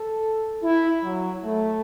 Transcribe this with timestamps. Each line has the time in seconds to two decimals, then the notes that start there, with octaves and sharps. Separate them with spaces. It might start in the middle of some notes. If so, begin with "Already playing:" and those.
Already playing: A4
0.63 E4
1.03 F#3
1.44 A3